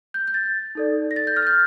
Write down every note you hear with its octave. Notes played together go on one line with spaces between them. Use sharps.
G6
G6
A6
D#4 A4 D5
A#6
A6
G6
F6
A6
G6